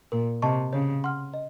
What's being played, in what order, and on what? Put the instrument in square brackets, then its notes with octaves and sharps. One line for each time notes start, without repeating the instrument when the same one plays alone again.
[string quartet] A#2 [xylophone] A#4
[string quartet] C3 [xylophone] D#5 A5 C#6
[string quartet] C#3 [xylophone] C#5
[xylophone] F#5 C6 F6
D#5